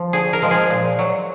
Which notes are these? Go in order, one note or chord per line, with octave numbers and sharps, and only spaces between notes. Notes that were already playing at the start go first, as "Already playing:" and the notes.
Already playing: F3
D3 G#4
A#4
F3 G#3
G#4
A#2
F#3